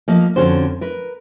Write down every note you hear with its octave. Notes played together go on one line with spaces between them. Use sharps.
F3 A#3 D#5
F2 A#2 D3 C#4 F#4 C5
A#4 B4